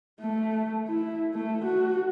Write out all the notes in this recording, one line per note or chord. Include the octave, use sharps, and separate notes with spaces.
A3
E4
A3
F#4